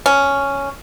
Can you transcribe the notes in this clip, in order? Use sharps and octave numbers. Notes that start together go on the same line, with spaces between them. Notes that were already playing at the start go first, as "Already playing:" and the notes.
C#4